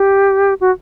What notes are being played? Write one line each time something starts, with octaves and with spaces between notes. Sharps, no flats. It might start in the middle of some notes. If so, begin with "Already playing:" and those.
Already playing: G4
F#4